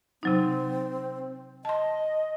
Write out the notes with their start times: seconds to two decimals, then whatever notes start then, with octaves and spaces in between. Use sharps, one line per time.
0.23 C3 F#3 C4 D#4
1.65 D#5 A5 C6